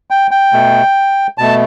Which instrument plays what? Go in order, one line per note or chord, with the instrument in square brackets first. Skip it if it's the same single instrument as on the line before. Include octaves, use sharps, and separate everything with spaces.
[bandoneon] G5
G5
B2 A3
B2 A3 A5